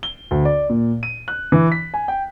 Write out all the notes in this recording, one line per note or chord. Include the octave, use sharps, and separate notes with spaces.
G7
D2
D5
A#2
D#7
F#6
E3
B6
G#5
G5